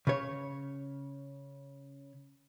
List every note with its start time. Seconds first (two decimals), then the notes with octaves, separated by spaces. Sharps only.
0.07 C#3 C#5